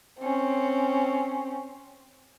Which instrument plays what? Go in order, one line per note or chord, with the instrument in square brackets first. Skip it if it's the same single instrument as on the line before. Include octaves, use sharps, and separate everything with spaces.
[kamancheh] C4 C#4